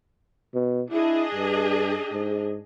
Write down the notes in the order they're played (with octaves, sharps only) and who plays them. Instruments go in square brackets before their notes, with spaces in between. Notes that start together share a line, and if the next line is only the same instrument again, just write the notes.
[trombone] B2
[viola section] D4 G#4 D#5 [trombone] E4
[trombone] G2
G#2